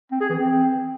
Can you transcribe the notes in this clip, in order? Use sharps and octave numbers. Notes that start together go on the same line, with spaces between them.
C4
G#4
E3
C4